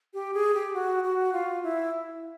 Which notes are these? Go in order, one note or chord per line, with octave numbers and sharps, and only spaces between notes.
G4
G#4
G4
F#4
F#4
F4
E4